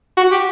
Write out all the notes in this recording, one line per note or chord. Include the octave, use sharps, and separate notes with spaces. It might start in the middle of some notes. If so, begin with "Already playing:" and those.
F#4
G4